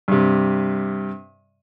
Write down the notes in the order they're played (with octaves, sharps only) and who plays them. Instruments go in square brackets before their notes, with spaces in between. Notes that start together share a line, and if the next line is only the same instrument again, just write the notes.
[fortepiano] G2 C3